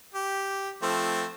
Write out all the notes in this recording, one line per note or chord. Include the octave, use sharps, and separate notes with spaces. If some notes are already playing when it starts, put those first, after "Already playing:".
G4
F3 A3 C4